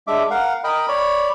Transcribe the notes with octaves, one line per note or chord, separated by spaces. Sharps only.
G#3 D4 E5 D6
A#4 F5 F#5
A#4 D#5 G5 B5
C#5 D5 B5